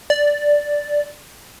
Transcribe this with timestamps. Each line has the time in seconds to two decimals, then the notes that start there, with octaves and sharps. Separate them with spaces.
0.10 D5